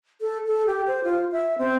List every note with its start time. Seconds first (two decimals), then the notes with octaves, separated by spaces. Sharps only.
0.21 A4
0.47 A4
0.67 G4
0.87 C5
1.04 F4
1.32 E5
1.58 C4